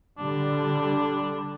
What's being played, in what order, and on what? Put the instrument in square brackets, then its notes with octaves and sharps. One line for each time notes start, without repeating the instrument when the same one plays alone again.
[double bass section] D3 G3 [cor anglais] D4